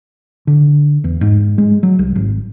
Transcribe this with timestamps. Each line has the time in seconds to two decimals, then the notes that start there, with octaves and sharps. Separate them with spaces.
0.47 D3
1.04 E2
1.21 G#2
1.58 G#3
1.83 F#3
1.99 C2
2.15 G#1